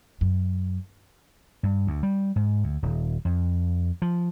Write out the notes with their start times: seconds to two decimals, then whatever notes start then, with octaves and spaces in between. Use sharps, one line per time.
0.21 F#2
1.63 G2
1.87 D2
2.03 G3
2.36 G#2
2.64 D2
2.83 D#1
3.25 F2
4.02 F3